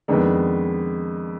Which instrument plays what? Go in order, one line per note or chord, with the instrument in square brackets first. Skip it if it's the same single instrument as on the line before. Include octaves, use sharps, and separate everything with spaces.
[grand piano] F2 D#3 G#3 B3 D4